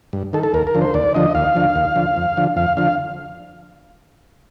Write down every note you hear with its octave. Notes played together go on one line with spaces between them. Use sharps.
G2
D#3 A4
A4
D#2 A#4
A#4
D3 F3
C5
D#2 D5
D3 F3 D#5
D#2 F5
D3 F3
D#2
D3 F3
F2
D3 F3
F2 F5
D3 F3 F5